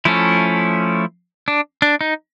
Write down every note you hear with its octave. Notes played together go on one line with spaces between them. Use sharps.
F3 A3 C#4 E4
D4
D4
D#4